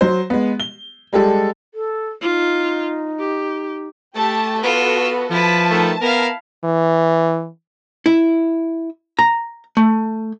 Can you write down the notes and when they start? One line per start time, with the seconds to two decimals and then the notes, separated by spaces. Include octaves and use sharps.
0.01 F#3 C5
0.30 G#3 B3
0.60 G7
1.13 G3 G#3 G4 A4
1.74 A4
2.21 D#4 F4
3.19 G4
4.15 A3 G4 A5
4.63 B3 F4 F#4 A4 B4 E6
5.30 F3 E4 B4 A5
5.70 D#3 A3
6.01 B3 E4 A#4 F5
6.64 E3
8.06 E4
9.19 A#5
9.77 A3